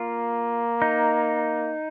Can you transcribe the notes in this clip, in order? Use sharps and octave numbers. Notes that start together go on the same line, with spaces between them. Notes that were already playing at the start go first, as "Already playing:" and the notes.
Already playing: A#3 F4
D#4